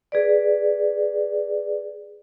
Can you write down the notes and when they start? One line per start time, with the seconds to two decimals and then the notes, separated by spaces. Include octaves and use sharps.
0.12 G#4 B4 D5